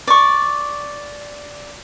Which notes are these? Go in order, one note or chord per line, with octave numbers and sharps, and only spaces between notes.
D5 C#6